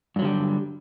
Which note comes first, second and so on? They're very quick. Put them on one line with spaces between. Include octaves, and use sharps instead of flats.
G2 F#3 D3 G3